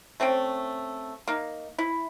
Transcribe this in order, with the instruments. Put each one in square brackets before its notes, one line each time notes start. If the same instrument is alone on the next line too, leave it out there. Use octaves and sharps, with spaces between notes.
[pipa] A3 C4 C#4 G5
A#3 D#4
E4